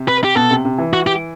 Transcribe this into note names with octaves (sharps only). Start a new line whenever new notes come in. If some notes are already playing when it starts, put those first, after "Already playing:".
Already playing: C3
B4
G4
B2 A4
C3
C3
E3
F#4
G4